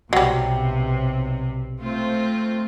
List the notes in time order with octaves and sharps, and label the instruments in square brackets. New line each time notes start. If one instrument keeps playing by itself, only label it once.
[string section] B1 C3 [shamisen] F#3 G3
[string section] A3 C4 F4